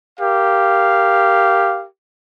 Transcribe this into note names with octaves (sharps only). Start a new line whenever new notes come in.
G4 A#4 F5